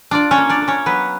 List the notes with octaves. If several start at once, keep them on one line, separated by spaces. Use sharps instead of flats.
D4 F4 D5
C#4 C#5
A#3
D4 D5
A#3
C#4 C#5
F#3 B3 B4